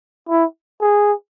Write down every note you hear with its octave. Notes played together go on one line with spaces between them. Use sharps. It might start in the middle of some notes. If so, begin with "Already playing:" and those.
E4
G#4